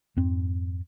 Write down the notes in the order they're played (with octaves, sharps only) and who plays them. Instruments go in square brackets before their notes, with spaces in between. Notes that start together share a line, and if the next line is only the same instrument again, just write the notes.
[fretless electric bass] F2 G#2 C4